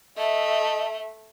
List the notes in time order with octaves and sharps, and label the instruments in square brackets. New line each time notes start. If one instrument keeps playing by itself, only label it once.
[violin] A3 [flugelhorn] D#5 [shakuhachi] E5 [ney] A5